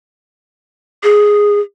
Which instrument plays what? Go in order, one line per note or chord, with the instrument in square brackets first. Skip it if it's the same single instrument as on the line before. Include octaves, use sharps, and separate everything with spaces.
[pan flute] G#4